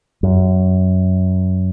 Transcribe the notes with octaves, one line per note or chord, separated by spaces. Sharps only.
F#2